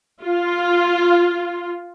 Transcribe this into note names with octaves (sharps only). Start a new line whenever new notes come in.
F4